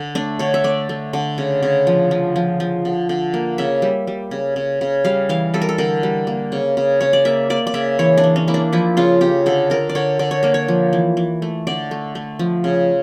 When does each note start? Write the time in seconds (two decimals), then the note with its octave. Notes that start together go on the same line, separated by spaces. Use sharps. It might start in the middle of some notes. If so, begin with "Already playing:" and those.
Already playing: D3
0.15 A3 D4
0.39 D3 C#5
0.54 E5
0.64 A3 D5
0.89 A3
1.13 D3
1.38 C#3
1.63 C#3
1.87 F3
2.11 F3
2.36 F3
2.60 F3
2.85 D3
3.09 D3
3.34 A#3
3.58 C#3 E5
3.82 G3
4.07 G3
4.31 C#3
4.56 C#3
4.81 C#3
5.05 G3 F5
5.29 E3 F5
5.54 G3 A4
5.62 A#4
5.69 A4
5.78 D3 A#4
6.03 G3
6.27 A#3
6.52 C#3
6.77 C#3
7.00 C#3 C#5
7.13 D5
7.25 A#3 E5
7.50 A#3 D5
7.67 D5
7.74 C#3 E5
7.99 E3 C#5
8.17 D4
8.24 E3
8.36 C#4
8.48 A#3 E4
8.54 D4
8.73 F3 E4
8.97 C#3 F4
9.21 C#3 G4
9.46 D3 A4
9.70 D3 A#4
9.89 D5
9.95 D3 C#5
10.19 D3 D5
10.31 C#5
10.43 A#3 A#4
10.54 C#5
10.68 F3
10.93 E3
11.17 E3
11.42 A3
11.67 D3 D5
11.91 A3
12.15 A3
12.39 F3
12.64 C#3